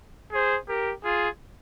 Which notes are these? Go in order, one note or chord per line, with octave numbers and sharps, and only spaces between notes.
G#4 C5
G4 A#4
F4 G#4